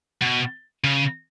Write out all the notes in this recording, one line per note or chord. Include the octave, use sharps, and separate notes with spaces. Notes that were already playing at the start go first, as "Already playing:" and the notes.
B2
C#3